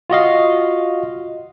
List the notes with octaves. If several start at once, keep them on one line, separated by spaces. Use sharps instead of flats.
F4 F#4 D#5 F5